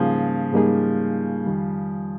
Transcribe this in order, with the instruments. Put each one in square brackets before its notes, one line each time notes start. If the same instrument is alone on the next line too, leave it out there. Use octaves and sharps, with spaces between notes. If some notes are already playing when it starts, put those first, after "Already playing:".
Already playing: [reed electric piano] G#2 G3 A#3 D#4 G#4 [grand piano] C#3 F3
[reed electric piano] G#2 G3 A#3 D#4 G#4
F2 D#3 G3